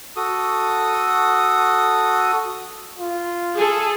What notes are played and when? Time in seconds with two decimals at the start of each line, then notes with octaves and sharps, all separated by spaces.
0.16 F#4 A4 D#6
2.98 F4
3.55 G#4 A4